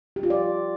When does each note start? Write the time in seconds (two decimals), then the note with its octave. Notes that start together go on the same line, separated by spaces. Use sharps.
0.16 G4
0.23 F4
0.30 D5